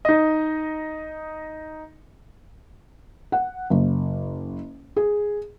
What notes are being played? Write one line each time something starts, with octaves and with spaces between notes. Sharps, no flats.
D#4 D#5
F#5
F#1
G#4